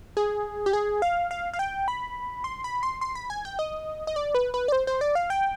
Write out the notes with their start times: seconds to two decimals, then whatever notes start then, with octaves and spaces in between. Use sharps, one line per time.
0.17 G#4
0.66 G4
0.73 G#4
1.02 F5
1.31 F5
1.53 F5
1.59 G5
1.88 B5
2.44 C6
2.64 B5
2.83 C6
3.01 C6
3.15 B5
3.30 G#5
3.45 G5
3.59 D#5
4.07 D#5
4.16 D5
4.35 B4
4.54 B4
4.68 D5
4.72 C5
4.87 C5
5.01 D5
5.15 F5
5.30 G5